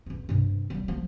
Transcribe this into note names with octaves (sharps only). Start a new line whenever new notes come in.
E2 F4
G2 C3
G3 B3
F3 A#3